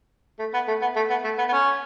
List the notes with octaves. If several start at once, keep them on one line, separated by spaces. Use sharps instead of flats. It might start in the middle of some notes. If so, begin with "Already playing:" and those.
A3
B3
A3
B3
A3
B3
A3
B3
B3
C#4